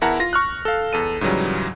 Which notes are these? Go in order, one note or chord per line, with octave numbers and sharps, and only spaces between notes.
E2 E4 A#4 F#5 A5 A#5
F4 A#6
C#6 F6 F#6
A4 F5
E2 A4 D#7
G#2 C#3 E3 F#3 G3